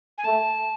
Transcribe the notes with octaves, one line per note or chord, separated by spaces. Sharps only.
G#5
A3 A5